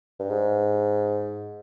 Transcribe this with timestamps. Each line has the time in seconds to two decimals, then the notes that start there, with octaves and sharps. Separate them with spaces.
0.20 G2
0.30 G#2